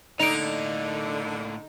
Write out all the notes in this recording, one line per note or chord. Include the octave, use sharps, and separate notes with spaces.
A2 D3 A#3 D#4 D7 F7